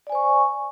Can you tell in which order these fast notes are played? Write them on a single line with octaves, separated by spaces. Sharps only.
D5 G#5 C5 C#6